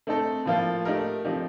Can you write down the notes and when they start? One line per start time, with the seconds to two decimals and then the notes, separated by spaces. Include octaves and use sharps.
0.07 A3 C4 D#4 A4
0.46 A2 F3 A#3 F4
0.85 A3 D#4 G4 A#4
1.25 F3 C4 D#4 G4